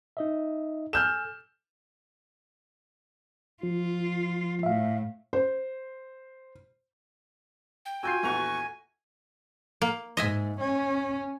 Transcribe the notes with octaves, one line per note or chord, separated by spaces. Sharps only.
D#4 D#5 E5
A4 G#5 E6 F6 G6 E7
F3 F4
A2 E5 F5
C5
G5
F4 F#4 G#5 E6 G6 C7
A#1 E2 A3 F#4 C#6 F7
A#3
G#2 D#5 E5 G#5
C#4